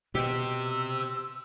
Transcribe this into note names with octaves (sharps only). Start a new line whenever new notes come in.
B2 G4 C5 E6